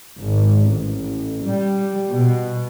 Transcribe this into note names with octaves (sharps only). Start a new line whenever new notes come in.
G#1
A1
G3
B2